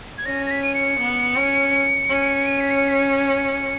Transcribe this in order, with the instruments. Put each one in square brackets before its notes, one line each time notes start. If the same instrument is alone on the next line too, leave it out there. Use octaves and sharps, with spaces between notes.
[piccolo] G#6
[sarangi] C#4 [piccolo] A#6
[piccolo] A#6
B6
D#7
C#7
[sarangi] B3
C#4
C#4
[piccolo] D#7
B6
C#7
B6
C#7
C#7